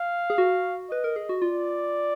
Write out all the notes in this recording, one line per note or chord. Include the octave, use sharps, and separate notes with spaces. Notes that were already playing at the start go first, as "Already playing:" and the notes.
Already playing: F5
G#4
F#4
B4 D#5
A#4
G#4
F#4
F4 D5